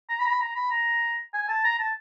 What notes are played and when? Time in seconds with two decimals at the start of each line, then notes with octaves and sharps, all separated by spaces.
0.09 A#5
0.19 B5
0.25 A#5
0.30 B5
0.40 A#5
0.55 B5
0.70 A#5
1.34 G#5
1.48 A5
1.64 A#5
1.79 A5